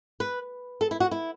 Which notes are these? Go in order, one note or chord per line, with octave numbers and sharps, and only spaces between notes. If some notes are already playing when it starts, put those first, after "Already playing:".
B4
A4
E4
F#4
E4